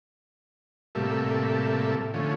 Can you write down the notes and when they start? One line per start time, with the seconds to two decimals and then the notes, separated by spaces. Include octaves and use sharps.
0.95 A2 C3 G3 A#3 A4 E5
2.14 D3 F3 A3 C#4